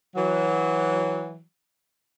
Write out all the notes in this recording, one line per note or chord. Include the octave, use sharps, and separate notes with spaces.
E3 F#3